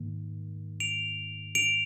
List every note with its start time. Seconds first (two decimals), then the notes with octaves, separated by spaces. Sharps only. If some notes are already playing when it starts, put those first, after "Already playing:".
Already playing: G#2 D#3 A#3
0.80 D7 F7
1.55 D7 F7